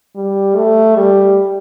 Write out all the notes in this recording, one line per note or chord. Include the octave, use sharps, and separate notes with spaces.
G3
A3
G3